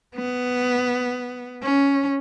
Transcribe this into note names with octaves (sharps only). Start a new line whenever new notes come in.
B3
C#4